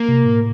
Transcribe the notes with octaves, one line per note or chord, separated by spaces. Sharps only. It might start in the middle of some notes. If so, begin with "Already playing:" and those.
Already playing: A#3
C3
A2